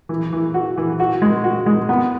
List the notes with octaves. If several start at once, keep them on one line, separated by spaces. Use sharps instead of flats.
E3
E3
F#4
E3
F#4
G#3
F#4
G#3
B3